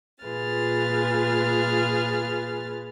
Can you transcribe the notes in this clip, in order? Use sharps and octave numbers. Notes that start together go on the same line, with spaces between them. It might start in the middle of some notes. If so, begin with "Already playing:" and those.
A#2 F4 G#4 B4 F6 A6